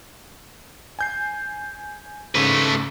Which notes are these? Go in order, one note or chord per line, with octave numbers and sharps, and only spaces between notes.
G#5 G6 C7
G#2 C#3 A3 B4 D#7